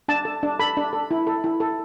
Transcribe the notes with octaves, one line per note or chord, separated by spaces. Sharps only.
D4 A5
A4
D4
A4 B5
D4
A4
E4
A4
E4
A4